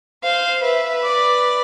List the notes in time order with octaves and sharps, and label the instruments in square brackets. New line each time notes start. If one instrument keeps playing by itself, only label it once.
[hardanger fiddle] C5 [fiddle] F5
[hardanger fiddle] B4 [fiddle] E5
[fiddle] D5